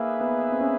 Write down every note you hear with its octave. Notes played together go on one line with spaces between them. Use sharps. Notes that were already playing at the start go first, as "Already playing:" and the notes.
Already playing: A#3 D#4 G#4 B4 E5
B3
C4
C#4